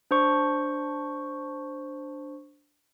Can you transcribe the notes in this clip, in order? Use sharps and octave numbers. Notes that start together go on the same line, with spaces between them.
D4 C5 C#6